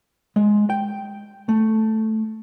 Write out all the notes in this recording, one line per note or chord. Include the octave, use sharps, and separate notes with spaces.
G#3
G5
A3